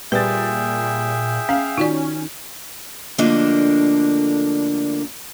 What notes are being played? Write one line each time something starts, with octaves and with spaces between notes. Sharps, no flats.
A#2 G3 G#4 B4 E5 G5 A6
C#4 F5
D#3 C#4 F4 F#4 D5
D2 D3 F3 A#3 D4 D#5